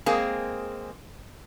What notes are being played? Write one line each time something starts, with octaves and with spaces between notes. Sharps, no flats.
G#3 A#3 C4 G#4